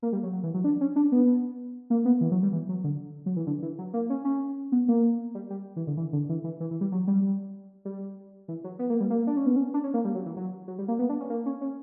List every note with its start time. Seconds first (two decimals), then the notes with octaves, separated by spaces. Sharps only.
0.02 A#3
0.13 G3
0.23 F#3
0.33 F#3
0.43 E3
0.54 F#3
0.64 D4
0.81 C#4
0.96 D4
1.12 B3
1.90 A#3
2.05 B3
2.21 E3
2.31 F#3
2.43 G3
2.52 E3
2.69 F#3
2.84 D3
3.26 F#3
3.36 E3
3.47 D3
3.62 E3
3.78 F#3
3.93 A#3
4.10 C#4
4.25 C#4
4.72 B3
4.88 A#3
5.35 G3
5.50 G3
5.76 E3
5.87 D3
5.97 E3
6.13 D3
6.29 E3
6.44 E3
6.60 E3
6.71 E3
6.81 G3
6.92 F#3
7.07 G3
7.85 G3
8.48 E3
8.64 F#3
8.79 B3
8.90 A#3
9.00 G3
9.10 A#3
9.27 D4
9.37 C#4
9.46 B3
9.56 C#4
9.74 D4
9.84 C#4
9.94 A#3
10.05 G3
10.15 F#3
10.26 E3
10.36 F#3
10.68 F#3
10.78 G3
10.88 A#3
10.99 B3
11.09 D4
11.20 C#4
11.30 A#3
11.46 C#4
11.61 C#4